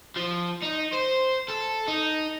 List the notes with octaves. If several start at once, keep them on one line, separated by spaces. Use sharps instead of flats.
F3
D#4
C5
A4
D#4